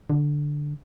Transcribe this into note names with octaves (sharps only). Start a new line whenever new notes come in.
D3